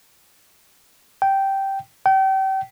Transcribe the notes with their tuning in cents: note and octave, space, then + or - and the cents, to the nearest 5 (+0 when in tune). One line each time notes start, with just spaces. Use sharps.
G5 -10
G5 -35